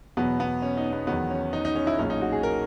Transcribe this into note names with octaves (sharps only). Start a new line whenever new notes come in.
E2 B2 F#3 B3
B3
C#4
D#4
B3
E2 D#3 F#3 B3
C#4
D#4
D#4
C#4
E4
B1 A#2 G#3 C#4
D#4
F#4
G#4
A#4